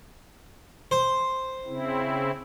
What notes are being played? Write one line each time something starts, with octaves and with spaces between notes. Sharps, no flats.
C5
C#3 C4 E4